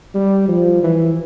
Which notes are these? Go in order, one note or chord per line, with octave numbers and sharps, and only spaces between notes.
G3
F3
E3